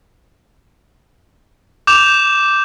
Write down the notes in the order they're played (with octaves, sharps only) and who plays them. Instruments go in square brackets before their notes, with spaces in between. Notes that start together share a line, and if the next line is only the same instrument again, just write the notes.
[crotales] D6 G6 E7 F7